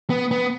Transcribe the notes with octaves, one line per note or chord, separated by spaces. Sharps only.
B3
B3